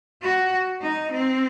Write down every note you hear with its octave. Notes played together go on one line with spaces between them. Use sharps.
F#4
D#4
C4